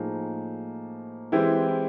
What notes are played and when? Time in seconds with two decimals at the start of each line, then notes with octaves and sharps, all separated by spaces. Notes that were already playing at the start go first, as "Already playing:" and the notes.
Already playing: A2 F3 A#3 D#4 G#4
1.32 E3 G#3 C4 E4 G4